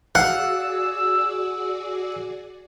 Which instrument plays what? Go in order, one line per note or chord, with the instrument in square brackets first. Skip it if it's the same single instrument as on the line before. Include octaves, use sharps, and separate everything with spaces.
[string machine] F#4 G#4 D5 [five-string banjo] F5 [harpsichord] F#5 [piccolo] E6